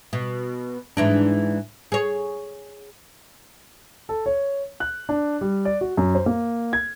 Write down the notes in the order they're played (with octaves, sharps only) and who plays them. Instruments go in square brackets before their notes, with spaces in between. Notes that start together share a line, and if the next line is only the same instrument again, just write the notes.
[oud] B2
G#2 E3 D4
G#4 C#5
[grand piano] A4
C#5
F#6
D4
G3
D5
F#4
F#2
C5
A#3
G#6